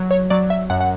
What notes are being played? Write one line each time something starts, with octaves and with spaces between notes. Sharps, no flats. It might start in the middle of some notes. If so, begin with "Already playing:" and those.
Already playing: F#3
C#5
F#3 D5
E5
F#2 F#5
F#5